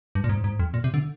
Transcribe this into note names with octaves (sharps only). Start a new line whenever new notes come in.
G2
A#2
G#2
G#2
F2
A#2
C3
D3